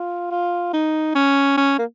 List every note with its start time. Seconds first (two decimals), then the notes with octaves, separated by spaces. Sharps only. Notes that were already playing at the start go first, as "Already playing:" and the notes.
Already playing: F4
0.31 F4
0.73 D#4
1.15 C#4
1.57 C#4
1.79 A#3